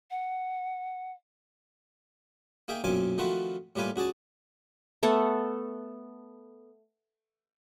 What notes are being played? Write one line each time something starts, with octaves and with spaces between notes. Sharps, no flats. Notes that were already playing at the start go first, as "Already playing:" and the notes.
F#5
A#3 D#4 G#4 E5 G5
B1 F#2 A#2 C4 G#5 D6
D#3 F3 A3 C4 F#4 B4
A2 G3 A#3 F4 B4 G#5
C#2 F#4 G#4 D5 A5
A3 B3 A4 F#5